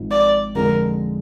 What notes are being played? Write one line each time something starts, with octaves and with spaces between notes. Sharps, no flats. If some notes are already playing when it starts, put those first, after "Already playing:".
Already playing: G#1 G#2 F3
D5
F2 D3 F3 G#3 A#4